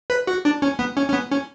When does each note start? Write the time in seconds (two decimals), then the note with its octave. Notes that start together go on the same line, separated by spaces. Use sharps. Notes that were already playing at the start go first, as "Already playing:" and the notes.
0.10 B4
0.27 F#4
0.45 D4
0.62 C#4
0.79 B3
0.97 C#4
1.08 C#4
1.13 B3
1.31 C#4